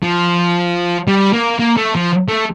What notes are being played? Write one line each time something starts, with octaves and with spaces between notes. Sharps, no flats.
F3
G3
A#3
A#3
A3
F3
A3